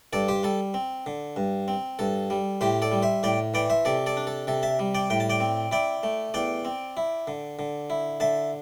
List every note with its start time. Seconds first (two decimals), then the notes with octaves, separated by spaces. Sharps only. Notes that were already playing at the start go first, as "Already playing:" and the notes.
0.13 G2 A4 D5
0.28 G4 C5
0.43 G3 A4
0.74 C4
1.06 D3
1.36 G2
1.68 C4
1.99 G2 A4
2.30 G3
2.61 A2 G4 C5
2.82 A4 D5
2.92 G3
3.02 C5 E5
3.23 A2 D5 G5
3.54 E3 D5 G5
3.70 C5 E5
3.85 C3 A4 D5
4.06 A4 D5
4.17 D4
4.27 A4
4.47 C3 A4
4.63 E5 A5
4.79 G3
4.95 D5 G5
5.10 A2 G5
5.20 A5
5.30 D5 G5
5.40 C4
5.71 E4 D5 G5
6.03 A3
6.34 E2 D5 G5
6.65 C4
6.97 E4
7.27 D3
7.59 D3
7.90 E4
8.20 D3 E5 A5